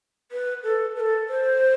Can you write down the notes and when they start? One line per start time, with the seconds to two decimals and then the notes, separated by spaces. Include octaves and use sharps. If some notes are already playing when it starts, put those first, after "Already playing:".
0.32 B4
0.64 A4
0.96 B4
1.00 A4
1.28 C5